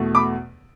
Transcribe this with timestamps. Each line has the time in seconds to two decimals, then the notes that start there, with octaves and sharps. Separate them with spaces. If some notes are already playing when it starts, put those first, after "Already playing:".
Already playing: E2 B2 A3
0.15 B5 D6